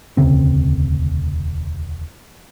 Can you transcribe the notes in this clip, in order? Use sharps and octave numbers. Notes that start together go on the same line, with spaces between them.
E1 D2 C#3 C4